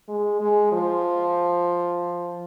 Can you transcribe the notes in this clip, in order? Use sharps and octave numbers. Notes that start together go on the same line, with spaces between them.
G#3
G#3
F3